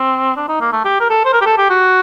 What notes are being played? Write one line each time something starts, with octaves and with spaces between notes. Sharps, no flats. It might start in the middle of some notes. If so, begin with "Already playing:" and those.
Already playing: C4
D4
D#4
A#3
A3
G4
A#4
A4
C5
A#4
G4
A4
G4
F#4